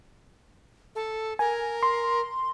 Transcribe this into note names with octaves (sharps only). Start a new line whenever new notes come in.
A4
A#4 G#5
C6